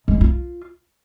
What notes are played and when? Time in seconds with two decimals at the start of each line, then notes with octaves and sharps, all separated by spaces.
0.08 G#3
0.14 E4
0.21 F4